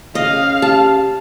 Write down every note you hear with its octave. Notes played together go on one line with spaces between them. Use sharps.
C#3 D#5 F5
G4 A5